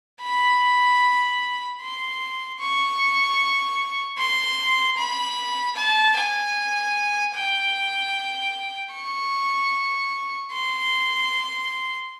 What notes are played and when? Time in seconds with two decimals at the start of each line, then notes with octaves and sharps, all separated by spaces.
0.22 B5
1.81 C6
2.60 C#6
4.19 C6
4.98 B5
5.76 A5
6.17 G#5
7.35 G5
8.94 C#6
10.52 C6